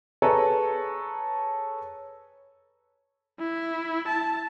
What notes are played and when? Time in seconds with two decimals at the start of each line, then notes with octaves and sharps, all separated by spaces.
0.22 G#4 A4 B4 C#5 A#5
3.40 E4
4.08 A5